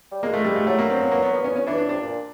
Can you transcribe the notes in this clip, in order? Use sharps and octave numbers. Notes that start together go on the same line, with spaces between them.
G3
G#3 A#3
A3
G3
A3
F#3 A3
A#3
C4
B3
A#3
B3
B3
C#4
C#4
E3 D4
D4
C3 D4
A#2